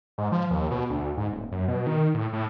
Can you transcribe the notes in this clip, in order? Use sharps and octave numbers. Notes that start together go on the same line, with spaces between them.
G#2
F3
D#2
B2
D2
G#2
D#1
F#2
B2
D#3
A2
A2